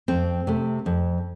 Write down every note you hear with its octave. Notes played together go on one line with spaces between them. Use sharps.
F2 C4
C3 A3
F2